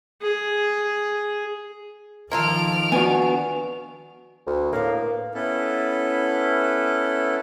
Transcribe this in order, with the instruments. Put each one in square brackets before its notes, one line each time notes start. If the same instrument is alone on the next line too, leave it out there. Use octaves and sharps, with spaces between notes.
[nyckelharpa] G#4
[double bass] D#3 F3 [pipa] A#3 F4 A4 [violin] F6 D7
[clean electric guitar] B3 D4 F#4 [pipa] G#5
[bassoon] D2
[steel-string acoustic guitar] A2 B3 F5 [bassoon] A#3
[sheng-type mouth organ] B3 C#4 E4 A4